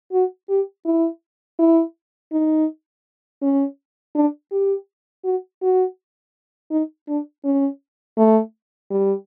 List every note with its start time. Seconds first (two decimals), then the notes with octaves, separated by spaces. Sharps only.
0.12 F#4
0.49 G4
0.86 E4
1.59 E4
2.33 D#4
3.42 C#4
4.15 D4
4.52 G4
5.24 F#4
5.62 F#4
6.71 D#4
7.08 D4
7.45 C#4
8.18 A3
8.91 G3